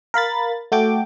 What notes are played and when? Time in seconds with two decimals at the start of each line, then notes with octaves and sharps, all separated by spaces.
0.14 A#4 F5 B5 A6
0.72 A3 F#4 A4 G5 D6